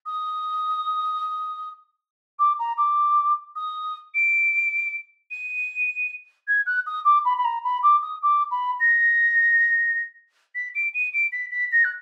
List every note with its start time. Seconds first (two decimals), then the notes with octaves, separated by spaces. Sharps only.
0.06 D#6
2.39 D6
2.59 A#5
2.77 D6
3.56 D#6
4.14 D7
5.31 D#7
6.48 G#6
6.66 F#6
6.86 D#6
7.05 D6
7.25 B5
7.37 B5
7.44 A#5
7.64 B5
7.83 D6
8.02 D#6
8.22 D6
8.51 B5
8.80 A#6
10.55 B6
10.75 D7
10.94 D#7
11.13 D7
11.32 B6
11.51 B6
11.72 A#6
11.84 F#6